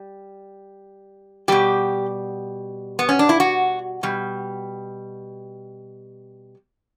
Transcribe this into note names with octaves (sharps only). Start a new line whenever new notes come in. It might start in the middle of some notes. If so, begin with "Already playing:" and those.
Already playing: G3
B2 G3 G4
B3
C#4
D4
E4
F#4
B2 G3